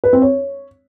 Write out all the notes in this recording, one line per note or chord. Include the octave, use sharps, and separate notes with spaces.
B4
C4
C#5